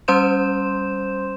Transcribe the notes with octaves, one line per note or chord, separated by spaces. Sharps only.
G3 C#4 C5 C6 G6 E7